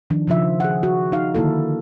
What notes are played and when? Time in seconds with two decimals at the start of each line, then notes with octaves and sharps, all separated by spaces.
0.10 D#3 F3 D4
0.28 C#3 F3 F4 E5
0.60 G#4 F#5
0.83 F#4
1.12 D#4 F5
1.35 D3 D#3 A#3 E4 A4